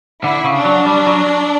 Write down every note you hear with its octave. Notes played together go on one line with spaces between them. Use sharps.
D3 E4
C#3
D4
F#3
G3
F#3